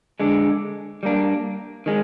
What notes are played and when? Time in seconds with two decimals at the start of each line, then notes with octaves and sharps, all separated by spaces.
0.20 D3 G#3 D4
1.03 G3 A#3 D4
1.86 D#3 G#3